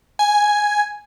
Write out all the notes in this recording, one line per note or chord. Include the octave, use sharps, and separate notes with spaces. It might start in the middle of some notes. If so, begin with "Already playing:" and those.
G#5